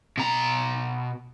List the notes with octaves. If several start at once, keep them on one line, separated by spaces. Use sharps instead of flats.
B2 A#5